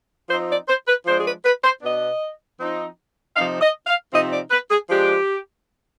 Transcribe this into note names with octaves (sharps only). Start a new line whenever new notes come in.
F3 C4 D#4 C5
D5
C5
B4
F3 G#3 D4 C5
G#4
B4
B4
C5
B2 B3 D4 D#5
F3 C4 D#4
C3 F3 C4 D#4 F5
D#5
F5
C3 F3 C4 D#4 D#5
D5
B4
G#4
F3 G#3 D4 G4